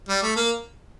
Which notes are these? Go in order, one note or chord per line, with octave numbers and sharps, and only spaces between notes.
G3
A3
A#3